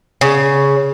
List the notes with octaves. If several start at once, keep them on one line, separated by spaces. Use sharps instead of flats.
C#3